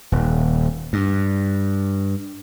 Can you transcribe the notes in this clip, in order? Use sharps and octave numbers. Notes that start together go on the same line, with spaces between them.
D#1
G2